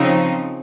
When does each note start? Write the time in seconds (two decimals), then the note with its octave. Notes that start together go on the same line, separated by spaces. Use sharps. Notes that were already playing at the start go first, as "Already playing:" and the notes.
Already playing: C#3 F3 C4 D#4